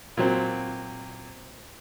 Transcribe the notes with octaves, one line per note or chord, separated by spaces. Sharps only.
A#2 F#3 C4